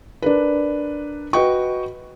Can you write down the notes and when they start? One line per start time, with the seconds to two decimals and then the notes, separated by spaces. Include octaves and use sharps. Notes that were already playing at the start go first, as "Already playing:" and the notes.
0.22 D4 A#4 B4
1.33 F#4 B4 D#5 G5 C#6